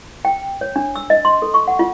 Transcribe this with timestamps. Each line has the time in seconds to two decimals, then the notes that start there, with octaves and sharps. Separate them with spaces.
0.25 G5
0.61 C#5
0.76 D4
0.96 E6
1.10 D#5
1.25 C6
1.42 A4
1.54 C#6
1.68 F#5
1.79 F4